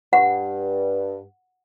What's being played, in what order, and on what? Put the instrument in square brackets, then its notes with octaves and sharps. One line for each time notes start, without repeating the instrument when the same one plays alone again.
[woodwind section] G2 [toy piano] F#5